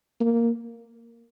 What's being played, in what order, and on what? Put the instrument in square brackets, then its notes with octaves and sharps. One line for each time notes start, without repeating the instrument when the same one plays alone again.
[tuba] A#3